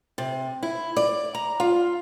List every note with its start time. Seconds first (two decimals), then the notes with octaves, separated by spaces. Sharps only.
0.18 C3
0.63 E4
0.97 D5
1.35 A#5
1.60 F4